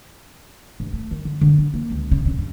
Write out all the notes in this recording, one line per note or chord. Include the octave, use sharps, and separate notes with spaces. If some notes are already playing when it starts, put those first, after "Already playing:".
G2
A3
D#3
D3
D3
D4
A#3
C#2
C#3
D3
G2